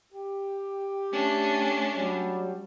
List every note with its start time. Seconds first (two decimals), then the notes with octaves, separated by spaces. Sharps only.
0.13 G4
1.12 A3 C#4 D4
1.95 F#3 G3